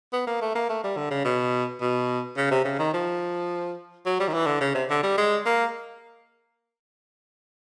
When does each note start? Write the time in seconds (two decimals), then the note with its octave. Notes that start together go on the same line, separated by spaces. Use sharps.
0.13 B3
0.27 A#3
0.42 A3
0.55 A#3
0.69 A3
0.84 G3
0.97 D3
1.11 C#3
1.25 B2
1.81 B2
2.37 C#3
2.51 C3
2.65 C#3
2.79 D#3
2.94 F3
4.06 F#3
4.20 G3
4.28 D#3
4.34 E3
4.47 D3
4.61 C#3
4.75 C3
4.90 D3
5.03 G3
5.18 G#3
5.46 A#3